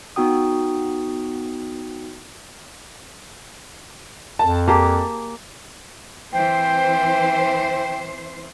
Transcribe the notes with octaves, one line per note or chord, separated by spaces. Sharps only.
B3 D#4 F#4 G5 D#6
F2 A5
A#3 G4 G#4 A5
E3 C4 C5 G5